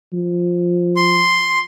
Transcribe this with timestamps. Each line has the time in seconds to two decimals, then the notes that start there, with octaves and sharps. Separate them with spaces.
0.13 F3
0.96 C6